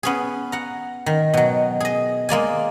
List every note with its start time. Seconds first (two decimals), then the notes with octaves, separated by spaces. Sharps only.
0.03 B3 C#4 G#4
0.52 F#5 A#5
1.06 D#3
1.34 B2 F#3
1.80 G#4 D#5
2.29 G#3 A#3 D5 G#5